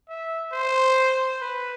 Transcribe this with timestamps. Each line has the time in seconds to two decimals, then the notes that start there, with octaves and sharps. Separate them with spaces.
0.09 E5
0.52 C5
1.41 B4